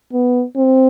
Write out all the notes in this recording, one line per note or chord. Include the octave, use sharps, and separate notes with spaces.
B3
C4